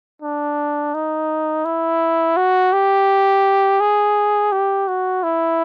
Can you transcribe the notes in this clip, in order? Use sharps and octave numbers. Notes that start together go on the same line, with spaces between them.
D4
D#4
E4
F#4
G4
G#4
G4
F#4
E4